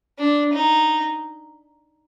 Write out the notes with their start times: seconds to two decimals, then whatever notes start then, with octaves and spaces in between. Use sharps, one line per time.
0.19 D4
0.53 D#4